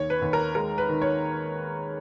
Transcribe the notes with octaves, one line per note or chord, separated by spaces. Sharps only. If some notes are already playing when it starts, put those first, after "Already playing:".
Already playing: D#2 C#5
B4
D#2
A#4
G#3 A#4
B4
D#3
C#5